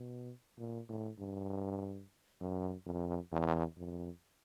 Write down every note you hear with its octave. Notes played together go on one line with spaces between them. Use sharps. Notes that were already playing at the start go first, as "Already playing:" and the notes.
Already playing: B2
A#2
A2
G2
F#2
F2
E2
F2